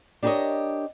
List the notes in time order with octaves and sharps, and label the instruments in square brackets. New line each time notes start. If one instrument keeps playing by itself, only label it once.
[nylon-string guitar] D4 G4 A#4 B4 C#5 D#5